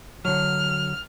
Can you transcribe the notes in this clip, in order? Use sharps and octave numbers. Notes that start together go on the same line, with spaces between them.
D3 F#3 F6